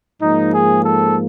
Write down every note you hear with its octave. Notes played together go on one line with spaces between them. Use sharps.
G#2 F3 A#3 D#4
G#4
A4